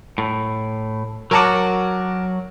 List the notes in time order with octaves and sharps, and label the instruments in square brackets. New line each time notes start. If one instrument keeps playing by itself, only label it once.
[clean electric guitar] A2
[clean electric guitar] F#3 F#4 [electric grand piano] A#4 A5 D6